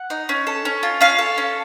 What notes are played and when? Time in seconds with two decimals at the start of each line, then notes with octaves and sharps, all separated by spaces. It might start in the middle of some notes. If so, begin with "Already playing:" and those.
Already playing: F#5
0.10 D#4
0.29 C#4
0.47 A4
0.65 C#4
0.83 F4
1.01 C#4 F5
1.19 A4
1.38 C#4